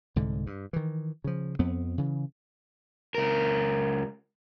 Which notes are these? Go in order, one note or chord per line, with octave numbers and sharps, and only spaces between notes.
C2 G#2 D3
G2
D#3 E3
C#3 F3
F2 B3 C4
C#3 E3
C#2 A#4